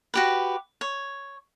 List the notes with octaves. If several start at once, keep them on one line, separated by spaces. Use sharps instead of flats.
F#4 G4 B4
C#5